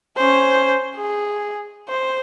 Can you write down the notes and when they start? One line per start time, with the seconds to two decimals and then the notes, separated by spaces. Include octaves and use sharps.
0.17 C#4 C5
0.96 G#4
1.88 C5